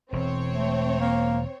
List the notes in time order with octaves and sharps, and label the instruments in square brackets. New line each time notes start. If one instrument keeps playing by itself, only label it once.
[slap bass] E1 E2 [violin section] C4 C#5
[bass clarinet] A3
A#3